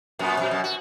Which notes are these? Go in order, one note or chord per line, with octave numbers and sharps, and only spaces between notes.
F#2 A#2 B3
F#2 B2
F#2 B2
F#4